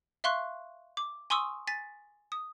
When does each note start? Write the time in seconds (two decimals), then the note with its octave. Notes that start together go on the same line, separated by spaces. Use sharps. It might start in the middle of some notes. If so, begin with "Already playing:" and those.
0.24 E5 F5 C6 C#6 F#6
0.97 D6
1.30 G#5 C6 C#6 D#6 E6
1.67 G#5 A6 B6
2.32 D#6